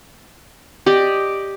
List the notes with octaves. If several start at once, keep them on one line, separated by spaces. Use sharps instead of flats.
G4 D5 D#5